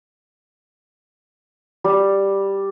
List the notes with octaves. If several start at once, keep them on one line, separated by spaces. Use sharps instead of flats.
G3